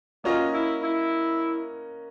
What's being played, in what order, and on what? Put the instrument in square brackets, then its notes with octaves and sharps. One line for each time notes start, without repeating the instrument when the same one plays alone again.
[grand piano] A#3 C#4 F#4 A#4 D#5 [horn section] F4
[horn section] E4
E4